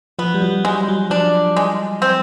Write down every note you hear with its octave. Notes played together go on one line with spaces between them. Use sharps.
F3 B3
G3
F#3
G3 G#3
F#3
F3 D4
G#3
C4